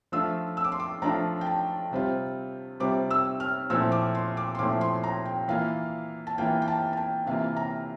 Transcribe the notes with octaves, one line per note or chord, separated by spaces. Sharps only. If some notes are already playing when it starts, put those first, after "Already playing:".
F3 A3 D4 F4 E6
E6
D6
C6
D6
F3 A3 D4 F4 A#5
G5
A5
C3 G3 C4 F4
C3 G3 C4 F4 D6
E6
F6
A#2 F3 A3 C4 E4 E6
D6
C6
D6
C6
A#2 F3 A3 C4 E4 D6
C6
A#5
G5
E3 A#3 F4 F5
A5
E3 A#3 F4 G5
G5
A5
A5
G5
C3 E3 A#3 F4 F5
A#5